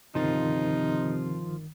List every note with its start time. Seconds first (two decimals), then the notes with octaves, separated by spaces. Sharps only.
0.15 G1 C3 D#3 F3 D#4 F4 A6